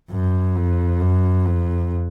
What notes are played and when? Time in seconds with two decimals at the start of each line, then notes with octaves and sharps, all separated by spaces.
0.10 F#2
0.56 F2
1.00 F#2
1.46 F2